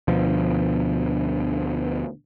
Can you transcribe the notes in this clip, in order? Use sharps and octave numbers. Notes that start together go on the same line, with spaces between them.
D2 B2 F3